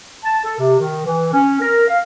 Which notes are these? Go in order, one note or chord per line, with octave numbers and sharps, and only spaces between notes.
A5
A4
C3
D#3
E3
C#4
A#4
F5